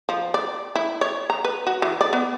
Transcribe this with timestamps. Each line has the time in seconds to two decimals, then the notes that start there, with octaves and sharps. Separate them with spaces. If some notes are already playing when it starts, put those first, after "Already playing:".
0.09 F3
0.34 D5
0.75 E4
1.01 C#5
1.30 A#5
1.44 B4
1.67 F#4
1.82 E3
2.01 D5
2.13 B3